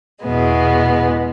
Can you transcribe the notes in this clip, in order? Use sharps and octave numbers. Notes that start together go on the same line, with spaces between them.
E2 B2 G#3 B3